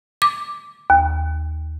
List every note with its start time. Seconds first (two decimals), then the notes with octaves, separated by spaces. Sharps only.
0.22 D6
0.90 D#2